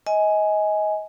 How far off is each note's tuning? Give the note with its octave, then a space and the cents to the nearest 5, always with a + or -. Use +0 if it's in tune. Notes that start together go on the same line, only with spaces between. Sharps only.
D#5 +25 G#5 +5